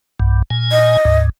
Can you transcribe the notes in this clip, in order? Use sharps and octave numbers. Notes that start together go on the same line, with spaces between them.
B1 G2
A#2 G#5
D#5
D2 G#2